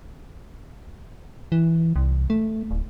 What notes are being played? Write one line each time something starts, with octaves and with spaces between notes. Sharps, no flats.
E3
C2
A3
D1